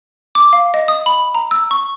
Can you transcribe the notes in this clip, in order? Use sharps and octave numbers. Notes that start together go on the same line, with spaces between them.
D6
F5
D#5
D#6
B5
A#5
E6
C#6